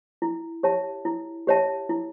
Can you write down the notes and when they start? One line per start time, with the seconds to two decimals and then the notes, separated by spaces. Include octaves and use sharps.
0.22 E4
0.63 G4 C#5 E5 A5
1.05 E4
1.47 G4 C#5 E5 A5
1.89 E4